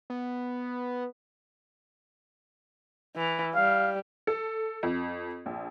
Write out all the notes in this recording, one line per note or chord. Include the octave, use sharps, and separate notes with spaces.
B3
E3
G3 F5
A4
F2
A#1